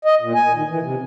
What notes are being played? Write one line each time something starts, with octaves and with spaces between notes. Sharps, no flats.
D#5
A#2
G#5
D#3
E3
C3